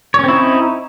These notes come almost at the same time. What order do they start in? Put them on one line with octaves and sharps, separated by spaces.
C#5 C#4 C4 E4 D#4